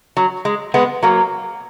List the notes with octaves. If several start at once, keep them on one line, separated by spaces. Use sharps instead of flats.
F#3
G#3
G#3 B3
F#3 A#3